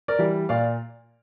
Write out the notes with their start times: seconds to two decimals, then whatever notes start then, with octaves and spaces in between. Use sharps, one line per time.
0.08 A#4 D5
0.19 E3 G3
0.49 A#2 D5 F5